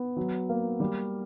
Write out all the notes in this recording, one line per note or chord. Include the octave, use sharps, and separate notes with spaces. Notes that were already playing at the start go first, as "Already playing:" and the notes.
Already playing: B3
F#3
A#3
G3